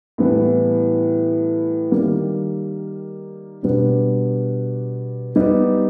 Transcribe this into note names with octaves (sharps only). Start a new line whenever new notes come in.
A2 E3 G3 B3
D#3 G3 A#3
B2 G3 B3 D4
G3 B3 D#4 G4